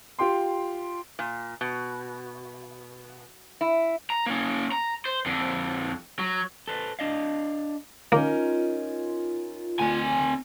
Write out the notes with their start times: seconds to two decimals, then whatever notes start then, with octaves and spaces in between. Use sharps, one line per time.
0.19 F4 G4 G5 C6
1.19 A#2
1.61 B2
3.61 E4
4.10 A#5
4.26 A#3 C#4
4.72 A#5
5.05 C5
5.26 F2 D3
6.19 F#3
6.68 A4 B4 C5
6.99 D4 D#5 F5
8.12 A#3 C#4 D#4 F4 A#4
9.80 D2 C4 G#5